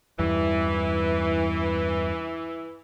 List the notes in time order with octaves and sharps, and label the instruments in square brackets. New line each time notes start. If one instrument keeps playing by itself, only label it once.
[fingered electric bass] E2 G2 [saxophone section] E3